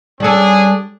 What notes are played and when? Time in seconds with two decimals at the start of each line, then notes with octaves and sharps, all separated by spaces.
0.20 G3 C#4 D4 G#4 A4